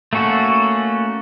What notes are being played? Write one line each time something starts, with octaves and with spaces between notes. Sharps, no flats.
A3 A#3 C#4 F#4 A4